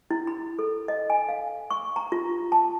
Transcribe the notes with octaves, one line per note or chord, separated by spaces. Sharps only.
E4
B5
A4
D#5
G#5
F5
C#6
A#5
F4
A5